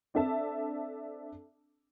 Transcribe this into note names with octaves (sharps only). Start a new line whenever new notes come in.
C4 D4 A4 E5 A5